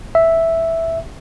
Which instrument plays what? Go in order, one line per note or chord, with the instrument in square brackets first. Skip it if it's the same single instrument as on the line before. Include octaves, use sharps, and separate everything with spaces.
[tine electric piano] E5